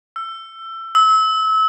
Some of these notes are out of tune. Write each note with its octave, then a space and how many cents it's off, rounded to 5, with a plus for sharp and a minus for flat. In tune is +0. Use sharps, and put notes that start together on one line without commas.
E6 +25
E6 -30